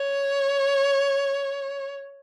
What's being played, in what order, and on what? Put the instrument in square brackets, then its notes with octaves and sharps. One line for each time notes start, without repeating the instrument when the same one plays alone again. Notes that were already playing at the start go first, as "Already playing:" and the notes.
Already playing: [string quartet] C#5